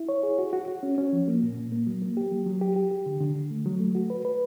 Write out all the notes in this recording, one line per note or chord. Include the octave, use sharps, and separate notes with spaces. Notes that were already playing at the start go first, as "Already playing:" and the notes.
Already playing: E4
C#5
G#4
F#4
F#4
F#4
C#4
C#4
F3
A#3
A#2
A#2
A#3
F#3
A#3
G4
F#3
F#3
G4
G4
G4
D3
D3
D3
A3
F#3
A3
F#4
B4
B4